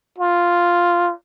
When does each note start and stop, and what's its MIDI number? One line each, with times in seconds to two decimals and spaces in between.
0.18 1.12 65